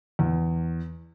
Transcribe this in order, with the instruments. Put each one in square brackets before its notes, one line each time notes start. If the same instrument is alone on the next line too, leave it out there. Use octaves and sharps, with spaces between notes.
[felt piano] E2